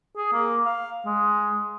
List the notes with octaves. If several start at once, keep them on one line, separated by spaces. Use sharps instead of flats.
G#4
A#3
F5
G#3